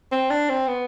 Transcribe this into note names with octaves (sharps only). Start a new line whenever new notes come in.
C4
D4
C4
B3